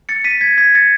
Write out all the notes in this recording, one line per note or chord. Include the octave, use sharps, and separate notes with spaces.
A6 C#7
B6 D#7
G#6 B6
G#6 B6
A6 C#7